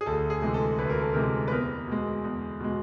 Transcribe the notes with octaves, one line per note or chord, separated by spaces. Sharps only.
G#4
D2 A4
G#4
C3 E3 G#3
A4
D2 B4
A#4
A4
C3 E3 G#3 A#4
B4
E2 A#4
B2 G#3
E2
B2 G#3